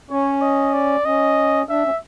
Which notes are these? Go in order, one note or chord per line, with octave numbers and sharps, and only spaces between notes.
C#4 C#5
D#5
D5
C#4 D#5
D4 E5
C#4